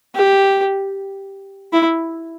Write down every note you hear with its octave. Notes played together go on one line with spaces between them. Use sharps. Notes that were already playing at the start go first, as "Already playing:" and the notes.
G4
E4